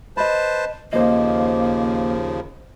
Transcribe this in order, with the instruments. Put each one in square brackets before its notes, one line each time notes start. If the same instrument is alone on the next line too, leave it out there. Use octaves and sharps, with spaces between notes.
[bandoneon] B4 C5 A5 [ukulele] D#5 B5
[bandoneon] D#2 C#3 F3 [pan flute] A#3 [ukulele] C5 D#5